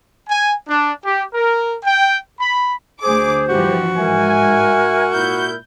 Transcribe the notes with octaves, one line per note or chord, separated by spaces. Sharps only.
G#5
D4
G4
A#4
G5
B5
D2 G#4 C5 D6
G2 E3 F3 F#4 G4
G#2 A#4 E5 G#5
A#2 E4 G6